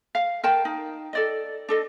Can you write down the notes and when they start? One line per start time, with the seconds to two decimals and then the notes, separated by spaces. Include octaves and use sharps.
0.15 F5
0.44 A#4 G5 A5
0.65 D#4
1.13 A4 D5 D#5
1.69 D4 A4 D#5